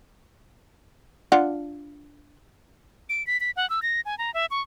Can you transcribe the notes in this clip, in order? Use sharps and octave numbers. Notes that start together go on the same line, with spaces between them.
D4 F4 F#5
D7
B6
B6
F#5
E6
A#6
G#5
A#5
E5
C#6